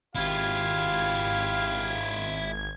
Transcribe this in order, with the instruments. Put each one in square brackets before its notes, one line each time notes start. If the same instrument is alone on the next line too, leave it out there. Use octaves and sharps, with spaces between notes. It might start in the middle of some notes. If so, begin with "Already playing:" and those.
[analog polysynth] G#1 G#6 [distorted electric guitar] E4 F4 [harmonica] G4 F5